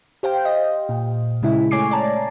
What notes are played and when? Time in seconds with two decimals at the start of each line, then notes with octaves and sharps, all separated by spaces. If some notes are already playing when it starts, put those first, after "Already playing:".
0.23 G4 C5 F5 G5
0.45 D#5
0.89 A#2
1.43 C#3 G#3 E4
1.71 A3 C#5 G#5 D6 C7
1.91 D5 A5 A#5